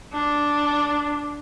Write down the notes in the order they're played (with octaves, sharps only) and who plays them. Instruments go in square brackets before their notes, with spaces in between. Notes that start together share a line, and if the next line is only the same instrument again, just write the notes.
[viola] D4